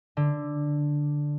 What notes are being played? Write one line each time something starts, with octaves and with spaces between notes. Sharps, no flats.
D3